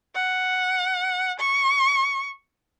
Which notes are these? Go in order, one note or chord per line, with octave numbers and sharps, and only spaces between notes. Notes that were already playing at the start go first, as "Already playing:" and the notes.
F#5
C#6